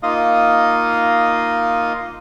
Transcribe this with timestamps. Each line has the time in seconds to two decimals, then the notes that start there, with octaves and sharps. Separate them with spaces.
0.03 A#3 D#4 F4 D#5 F5 D#6